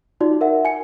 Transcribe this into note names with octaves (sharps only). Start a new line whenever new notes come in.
D#4 F4 F#4 D5
A#4 E5 F#5
G#5 C#7